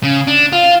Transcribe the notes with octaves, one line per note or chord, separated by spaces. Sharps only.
C#3
D4
F4